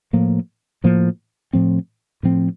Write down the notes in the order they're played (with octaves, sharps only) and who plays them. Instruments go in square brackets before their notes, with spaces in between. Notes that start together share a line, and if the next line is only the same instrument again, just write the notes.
[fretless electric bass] A2 F3 A#3
A2 F3 A#3
A2 F3 C4
A2 F3 C4